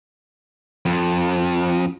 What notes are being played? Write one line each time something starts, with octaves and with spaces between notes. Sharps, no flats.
F2